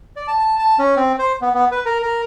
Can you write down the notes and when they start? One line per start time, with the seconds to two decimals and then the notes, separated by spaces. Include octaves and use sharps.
0.16 D5
0.27 A5
0.39 A5
0.59 A5
0.79 C#4
0.97 C4
1.18 C5
1.41 B3
1.54 B3
1.71 B4
1.85 A#4
2.02 A#4